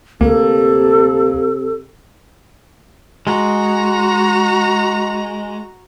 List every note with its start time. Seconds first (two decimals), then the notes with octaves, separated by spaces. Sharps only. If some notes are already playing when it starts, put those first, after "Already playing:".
0.21 D2 C3 A#3 A4
3.27 G#3 F#4 A#5